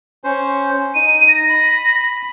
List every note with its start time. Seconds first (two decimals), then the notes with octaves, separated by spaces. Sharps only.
0.24 C#4 C5
0.95 D#4 D#7
1.29 A#6
1.49 B5